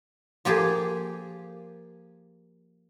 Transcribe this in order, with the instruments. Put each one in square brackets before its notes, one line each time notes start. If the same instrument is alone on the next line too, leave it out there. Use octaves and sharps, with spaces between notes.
[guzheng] F3 A#3 G4 G#4